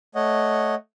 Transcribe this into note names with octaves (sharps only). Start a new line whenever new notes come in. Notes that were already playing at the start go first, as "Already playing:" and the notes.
A3 C#5 D#5 F#5